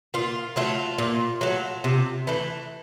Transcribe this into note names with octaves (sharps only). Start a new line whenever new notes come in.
A#2 F4
F#3 A3 F4
A#2
F#3 A3
C3
E3 A3